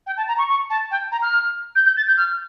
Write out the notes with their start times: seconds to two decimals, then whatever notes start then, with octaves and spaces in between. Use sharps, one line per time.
0.06 G5
0.17 A5
0.28 A#5
0.38 C#6
0.49 C#6
0.70 A5
0.91 G5
1.12 A#5
1.22 F6
1.75 G6
1.86 G6
1.97 A6
2.07 G6
2.17 F6